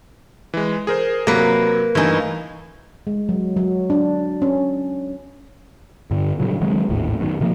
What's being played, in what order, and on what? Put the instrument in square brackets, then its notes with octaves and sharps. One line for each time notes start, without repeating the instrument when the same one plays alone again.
[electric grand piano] E3 G#3
G#4 A#4 C5
[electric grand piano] C3 F#3 [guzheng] A#3 B4
[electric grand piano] G2 A3 G#5 [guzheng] E3 D#4
[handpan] G#3
F#3
F#3
D4
C#4
[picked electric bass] G2 D3
G2 A#2 C#3 F#3
D#3 F#3 G#3 C4
G#1 D#2 A2
F#2 D#3
B2 D#3 F3 A#3